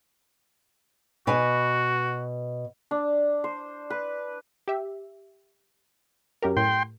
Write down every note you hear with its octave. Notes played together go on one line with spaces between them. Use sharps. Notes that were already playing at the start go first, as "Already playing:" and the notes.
B2 F#4 B4 G#5
D4
C5
B4
G4 E5
F#2 G4 A#4
A2 G5 C6